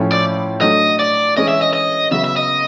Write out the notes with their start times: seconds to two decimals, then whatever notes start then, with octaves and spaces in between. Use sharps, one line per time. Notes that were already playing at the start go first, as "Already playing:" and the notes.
Already playing: A2 F3 A3 C#4 E4
0.12 D5
0.61 F#3 A3 D4 D#5
0.99 D5
1.36 E3 G#3 C#4 D#5
1.49 E5
1.62 D#5
1.73 D#5
2.11 C#3 F#3 B3 E5
2.24 E5
2.36 D#5